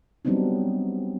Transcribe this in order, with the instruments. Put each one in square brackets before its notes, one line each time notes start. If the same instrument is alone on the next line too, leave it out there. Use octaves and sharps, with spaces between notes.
[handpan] F#3 G3 B3 C4 D4 D#4